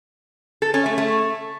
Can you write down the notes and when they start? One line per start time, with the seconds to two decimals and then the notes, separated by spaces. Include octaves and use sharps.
0.62 A4
0.74 C#4
0.86 A3
0.98 A3